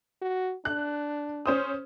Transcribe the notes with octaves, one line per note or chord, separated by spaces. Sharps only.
F#4
D4 F#6
C#4 C5 D#6